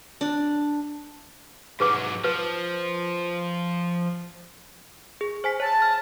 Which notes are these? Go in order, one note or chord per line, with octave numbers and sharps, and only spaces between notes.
D4
G#2 F#3 G#4 B4 D6
F3 B4
G#4
C5 G#5 B6
C#5 A5
F6